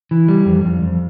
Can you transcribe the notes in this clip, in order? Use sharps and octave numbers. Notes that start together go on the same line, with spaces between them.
E3
G3
F2
F2
F2